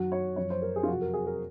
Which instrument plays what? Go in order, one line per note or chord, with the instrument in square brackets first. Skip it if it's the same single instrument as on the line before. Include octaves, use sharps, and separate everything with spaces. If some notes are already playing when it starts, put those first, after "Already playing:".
Already playing: [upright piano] F#2 D#3 F#3 F#4
C#5
F#2 F3 C#5
C5
A#4
G#4
F4
F2 C3 F#3 F#4
A#4
G#4
A#4